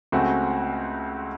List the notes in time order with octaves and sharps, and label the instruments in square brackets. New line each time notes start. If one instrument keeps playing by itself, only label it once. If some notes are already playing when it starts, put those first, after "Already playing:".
[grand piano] C#2 C#3 A3 C4 F#4